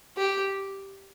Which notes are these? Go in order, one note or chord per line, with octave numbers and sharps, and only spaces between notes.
G4